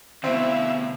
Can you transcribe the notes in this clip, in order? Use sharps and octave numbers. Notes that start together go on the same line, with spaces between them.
D2 B2 C4 E4 E5 F5